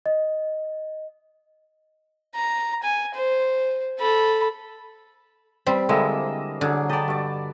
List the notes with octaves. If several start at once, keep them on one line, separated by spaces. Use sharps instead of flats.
D#5
A#5
G#5
C5
A4 B5
G3 C4 B5
D3 G#3 A#3 E4 D#5 E6
D3 F#3 G#4 D6
D5 D#5 G5 A5 B5
G2 F#4 D5